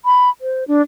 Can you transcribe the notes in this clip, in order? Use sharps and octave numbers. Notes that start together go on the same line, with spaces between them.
B5
C5
D4